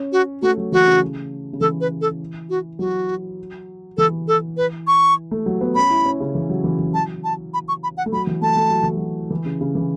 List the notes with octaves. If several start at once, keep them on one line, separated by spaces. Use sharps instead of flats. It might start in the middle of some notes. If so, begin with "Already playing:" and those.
Already playing: C#4
F#4
A3 F#4
F#3
E3 F#4
C#3
C#3
E3 A4
B4
A4
F#4
F#3 F#4
E3 A4
A4
B4
C#6
A3
F#3
B3
C#4 B5
E4
C#4
C#3
E3
F#3
E3
E3
F#3 A5
A5
B5
C#6
B5
F#5
A3
F#3 B5
E3
A3 A5
A3
F#3
E3
F#3
E3
C#3
C#3
E3